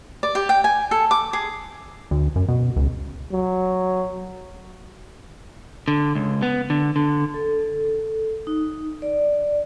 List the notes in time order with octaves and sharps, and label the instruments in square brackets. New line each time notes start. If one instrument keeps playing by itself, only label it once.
[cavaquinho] D5
G4
G5
G#5
A4
D6
G#4
[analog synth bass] D2
F#2
B2
C#2
[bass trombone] F#3
[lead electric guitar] D3
C#2
B3
D3
D3
[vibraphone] A4
D#4
D5